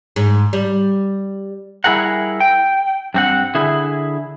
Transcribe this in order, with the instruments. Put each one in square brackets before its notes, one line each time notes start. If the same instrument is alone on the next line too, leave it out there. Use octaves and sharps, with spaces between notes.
[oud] G#2
G3
[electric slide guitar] G3 E4 G#4 A#4 F#5
G5
G2 C4 F#5
D3 E4 G#4